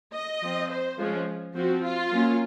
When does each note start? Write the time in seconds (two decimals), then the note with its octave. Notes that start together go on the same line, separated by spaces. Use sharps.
0.14 D#5
0.42 F3 C4
0.70 C5
0.98 F3 G#3 C#4
1.55 F3 C4 F#4
1.83 F4
2.11 F#3 A#3 C#4